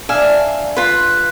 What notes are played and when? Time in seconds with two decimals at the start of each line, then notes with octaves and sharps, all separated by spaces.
0.09 D4 E5 F5 G#5
0.77 F4 B4